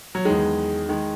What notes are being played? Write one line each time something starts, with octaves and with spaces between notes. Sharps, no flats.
F#3
E2 D#3 G#3
D#3 G#3